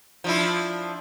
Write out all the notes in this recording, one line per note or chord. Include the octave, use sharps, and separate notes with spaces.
F3 D4 E4